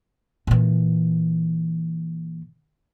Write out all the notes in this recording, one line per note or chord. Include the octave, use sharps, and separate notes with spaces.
A#2 E3